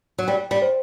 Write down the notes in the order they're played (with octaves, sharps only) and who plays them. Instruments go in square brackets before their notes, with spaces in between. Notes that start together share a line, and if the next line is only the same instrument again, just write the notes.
[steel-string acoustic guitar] F#3
[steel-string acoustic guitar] G3 [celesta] G5
[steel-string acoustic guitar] G3
[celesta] C5